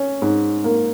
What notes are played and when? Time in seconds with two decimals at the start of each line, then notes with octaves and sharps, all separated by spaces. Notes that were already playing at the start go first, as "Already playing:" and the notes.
Already playing: C#4
0.22 G#2
0.64 A#3